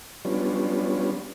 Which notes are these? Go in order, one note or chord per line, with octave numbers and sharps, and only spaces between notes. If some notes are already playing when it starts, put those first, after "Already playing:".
F#3 G3 B3 C#4 D4 F4